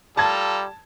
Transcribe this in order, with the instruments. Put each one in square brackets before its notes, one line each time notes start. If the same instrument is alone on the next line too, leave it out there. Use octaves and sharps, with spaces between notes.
[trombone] G3 [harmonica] F4 A4 A#5 [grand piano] A5 G#6